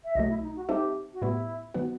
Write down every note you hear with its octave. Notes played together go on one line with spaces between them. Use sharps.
E5
C2 B2 F#3 A3 D#5
E4
D#4
F#4
G3 C4 D#4 G4 A4 E5
F#4
A2 G3 B3 E4
D#3 F#3 B3 F#4